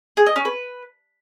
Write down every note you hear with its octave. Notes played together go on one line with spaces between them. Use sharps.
G#4
D#5
C#4
B4